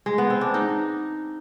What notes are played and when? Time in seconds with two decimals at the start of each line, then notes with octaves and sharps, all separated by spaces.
0.06 G#3
0.18 B3
0.30 C4
0.41 D4
0.54 D#4